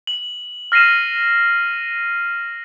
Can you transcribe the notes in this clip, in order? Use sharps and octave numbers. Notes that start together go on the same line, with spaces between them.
F#7
F6 A#6 C7 D#7 E7